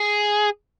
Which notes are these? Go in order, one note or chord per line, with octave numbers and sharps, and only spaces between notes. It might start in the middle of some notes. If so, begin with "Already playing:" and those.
Already playing: G#4